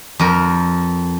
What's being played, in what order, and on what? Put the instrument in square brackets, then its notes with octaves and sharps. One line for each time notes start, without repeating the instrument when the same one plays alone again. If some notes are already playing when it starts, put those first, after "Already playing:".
[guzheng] F2 A#4